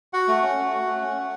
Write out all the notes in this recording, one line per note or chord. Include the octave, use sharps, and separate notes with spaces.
F#4 F#5
A3
C#4
A3
F#4
A3
C#4
A3